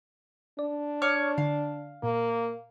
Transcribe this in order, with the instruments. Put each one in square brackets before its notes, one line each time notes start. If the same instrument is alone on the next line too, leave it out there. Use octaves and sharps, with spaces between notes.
[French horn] D4 [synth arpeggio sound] D5
[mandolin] C#5 D6 F6
[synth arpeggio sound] D3 [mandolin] F5
[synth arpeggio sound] A#2 [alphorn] A#3